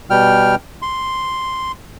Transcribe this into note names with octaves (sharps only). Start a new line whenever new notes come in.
B2 G3 G5 F6
C6